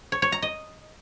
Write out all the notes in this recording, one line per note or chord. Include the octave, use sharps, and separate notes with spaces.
C#5
C#5
A#5
D#5